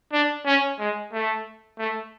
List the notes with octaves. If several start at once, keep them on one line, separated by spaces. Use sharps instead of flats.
D4
C#4
G#3
A3
A3